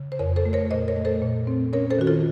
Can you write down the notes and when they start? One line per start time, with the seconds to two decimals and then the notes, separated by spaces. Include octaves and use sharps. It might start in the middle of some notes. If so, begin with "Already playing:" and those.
Already playing: C#3
0.12 C5
0.19 F2 A#4 C#5
0.36 A4 C5
0.46 A3
0.53 A#4 C#5
0.71 A#2 C5 D#5
0.88 A#4 C#5
0.96 A3
1.05 A4 C5
1.22 A#2
1.47 C4
1.73 C#4 A#4 C#5
1.90 A4 C5
1.99 D#3 F#4
2.07 F4 A4